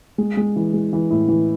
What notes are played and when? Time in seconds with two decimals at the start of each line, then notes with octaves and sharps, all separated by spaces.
0.18 G#3
0.37 G#3
0.56 E3
0.73 G#3
0.93 E3
1.11 A2
1.28 E3